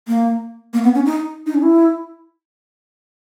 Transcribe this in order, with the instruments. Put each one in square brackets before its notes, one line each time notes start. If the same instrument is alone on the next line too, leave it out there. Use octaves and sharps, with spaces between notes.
[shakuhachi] A#3
A#3
B3
C#4
D#4
D#4
C#4
E4